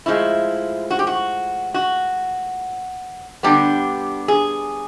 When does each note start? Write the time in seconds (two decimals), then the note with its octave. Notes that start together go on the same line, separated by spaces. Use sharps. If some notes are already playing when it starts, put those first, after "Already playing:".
0.06 A2 F3 G#3 E4
0.91 F#4
0.99 G4
1.07 F#4
1.74 F#4
3.43 D3 G3 B3 D4 G4
4.28 G#4